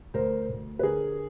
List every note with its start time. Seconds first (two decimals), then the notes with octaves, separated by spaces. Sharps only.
0.14 D2 A#4 C5
0.49 D2
0.79 B4
0.83 D3 G#4 A#4